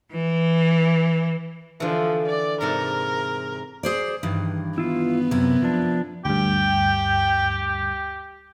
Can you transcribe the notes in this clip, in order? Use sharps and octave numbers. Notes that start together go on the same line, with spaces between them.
E3
D3 E3 F3
D5
G#2 C3 A#4 A5
G#4 C5 D5
G2 D#3 E3
B3 E4 F4
F#2 C3 E4 A#4
F3 D4
D2 G2 G4 G5